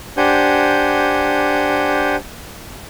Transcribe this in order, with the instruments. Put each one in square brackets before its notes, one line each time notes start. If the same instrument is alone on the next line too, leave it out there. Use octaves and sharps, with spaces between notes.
[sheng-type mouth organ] D4 G4 C5 F#5 G#5 G6